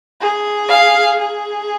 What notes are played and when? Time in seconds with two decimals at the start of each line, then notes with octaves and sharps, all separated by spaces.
0.21 G#4
0.69 F5
1.19 G#4